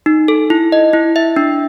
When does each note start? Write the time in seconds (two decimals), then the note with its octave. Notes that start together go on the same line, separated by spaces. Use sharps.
0.06 D#4
0.28 A4
0.50 E4
0.72 D#5
0.93 E4
1.16 E5
1.36 D4